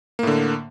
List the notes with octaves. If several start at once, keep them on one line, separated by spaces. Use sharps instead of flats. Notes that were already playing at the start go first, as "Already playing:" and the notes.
A2 D3 A#3